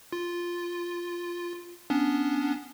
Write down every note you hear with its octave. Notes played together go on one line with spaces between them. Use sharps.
F4
B3 C#4 D4